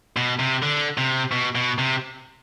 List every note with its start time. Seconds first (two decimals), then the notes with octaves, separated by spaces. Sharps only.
0.17 B2
0.39 C3
0.63 D3
0.98 C3
1.32 B2
1.55 B2
1.78 C3